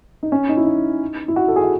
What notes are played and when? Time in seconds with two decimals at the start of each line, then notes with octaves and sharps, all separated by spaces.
0.23 D#4
0.32 C#4
0.49 D#4
0.57 E4
0.65 D#4
1.28 E4
1.36 F#4
1.48 A4
1.56 G#4
1.63 F#4